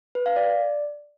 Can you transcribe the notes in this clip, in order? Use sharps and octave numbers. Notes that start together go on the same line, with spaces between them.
B4
F5
D5